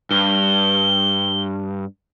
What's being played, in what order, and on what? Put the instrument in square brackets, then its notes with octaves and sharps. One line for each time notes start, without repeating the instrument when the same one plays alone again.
[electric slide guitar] G2 [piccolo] G7